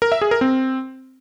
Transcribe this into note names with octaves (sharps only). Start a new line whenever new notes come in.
A#4
E5
G#4
A#4
C4